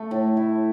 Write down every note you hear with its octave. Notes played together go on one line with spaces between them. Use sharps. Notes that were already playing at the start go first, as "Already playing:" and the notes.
Already playing: A3
A2
E4